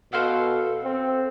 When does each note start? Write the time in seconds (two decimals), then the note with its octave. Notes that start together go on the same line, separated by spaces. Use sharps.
0.13 B2 A4 C5 F5 F#5
0.84 C4